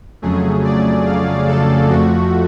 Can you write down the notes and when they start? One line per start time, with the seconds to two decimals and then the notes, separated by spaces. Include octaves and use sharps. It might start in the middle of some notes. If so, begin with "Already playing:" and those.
0.22 F2 C#3 F#3 A3 G#4
0.65 D5
1.06 F5
1.48 A4
1.90 F2 F3 A3 F#4